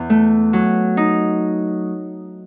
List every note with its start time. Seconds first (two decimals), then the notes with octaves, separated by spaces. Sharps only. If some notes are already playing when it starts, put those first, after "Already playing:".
Already playing: E2
0.10 A3
0.53 F#3
0.97 D#4